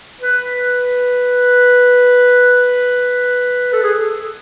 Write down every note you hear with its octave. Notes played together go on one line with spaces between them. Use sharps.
B4
A4
G#4
A4